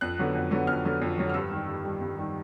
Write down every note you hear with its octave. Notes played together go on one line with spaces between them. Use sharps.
F2 F#6
D3 F#3 B3
F2
D3 F#3 B3
F2 F6
D3 F#3 B3
F2
D3 F#3 B3
F6
G2 E6
D#3 G3
G2
D#3 G3
G2
D#3 G3